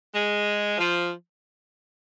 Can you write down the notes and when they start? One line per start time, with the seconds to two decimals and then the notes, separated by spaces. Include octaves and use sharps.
0.14 G#3
0.78 F3